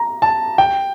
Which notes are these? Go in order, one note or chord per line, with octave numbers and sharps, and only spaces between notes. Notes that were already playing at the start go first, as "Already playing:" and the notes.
Already playing: A#5
A5
G5